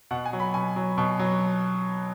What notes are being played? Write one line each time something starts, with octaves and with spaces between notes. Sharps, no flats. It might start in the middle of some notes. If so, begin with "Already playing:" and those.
B2 F#5
G#5
F#3
B5
B2 G#5
F#3
B2
F#3